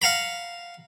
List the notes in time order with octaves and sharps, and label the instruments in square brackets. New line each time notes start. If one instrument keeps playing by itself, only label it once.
[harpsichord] F5 F#5 A#5 B5